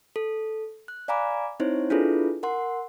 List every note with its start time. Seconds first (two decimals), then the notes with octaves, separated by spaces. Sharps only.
0.16 A4
0.88 F#6
1.08 D5 F5 G#5 A#5 B5 D6
1.60 C4 D#4 E4 C5 C#5
1.90 D4 E4 F4 G#4 A4 B4
2.43 A#4 F#5 C6